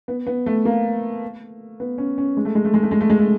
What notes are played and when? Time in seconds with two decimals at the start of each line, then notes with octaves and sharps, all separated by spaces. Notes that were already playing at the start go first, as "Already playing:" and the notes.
0.08 B3
0.27 B3
0.46 A3
0.65 A#3
1.80 B3
1.98 C#4
2.18 C#4
2.37 G#3
2.45 A3
2.55 G#3
2.65 A3
2.74 G#3
2.83 A3
2.91 G#3
3.01 A3
3.10 G#3
3.19 A3